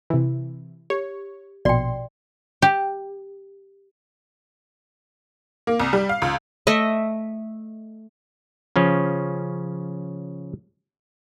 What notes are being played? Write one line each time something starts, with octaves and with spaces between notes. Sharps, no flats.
C3 E3
G4 C#5
A#1 B2 D5 G5 C6
G4
A#3
C2
G3
F5
C#2
A3 D#5 E5
C#3 F3 C#4